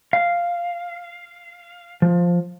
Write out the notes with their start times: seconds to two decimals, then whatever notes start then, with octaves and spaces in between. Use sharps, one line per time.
0.13 F5
2.02 F3